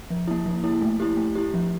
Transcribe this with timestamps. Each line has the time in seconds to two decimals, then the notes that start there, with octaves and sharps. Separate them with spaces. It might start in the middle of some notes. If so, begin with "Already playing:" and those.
0.10 F3
0.28 A#3 E4
0.46 F3
0.64 A#3 E4
0.81 A3
1.00 E4 G4
1.17 A3
1.35 E4 G4
1.54 F3